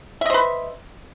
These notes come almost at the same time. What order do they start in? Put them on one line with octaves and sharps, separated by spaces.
E5 D#5 C5 B4